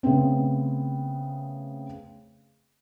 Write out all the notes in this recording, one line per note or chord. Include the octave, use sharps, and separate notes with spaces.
C#3 A3 B3 C4